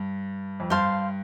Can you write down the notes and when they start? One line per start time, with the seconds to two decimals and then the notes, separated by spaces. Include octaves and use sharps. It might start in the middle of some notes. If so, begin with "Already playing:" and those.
Already playing: G2
0.60 F2
0.70 G2 C5 F5 A5 C6